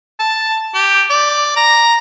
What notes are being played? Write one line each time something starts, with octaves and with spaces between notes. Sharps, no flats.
A5
G4
D5
A#5